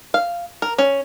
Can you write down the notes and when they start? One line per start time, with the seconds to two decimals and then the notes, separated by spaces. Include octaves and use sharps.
0.14 F5
0.62 A#4
0.78 C#4